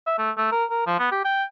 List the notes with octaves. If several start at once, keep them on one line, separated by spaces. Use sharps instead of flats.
E5
A3
A3
A#4
A#4
F3
B3
G4
G5